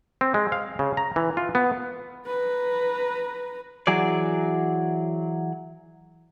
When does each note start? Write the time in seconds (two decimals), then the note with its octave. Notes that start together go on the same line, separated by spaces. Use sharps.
0.21 C4
0.34 G#3
0.52 F5
0.79 C#3
0.97 A#5
1.16 E3
1.37 F4
1.55 B3
2.26 B4 A#5
3.87 E3 F#3 G#4 D5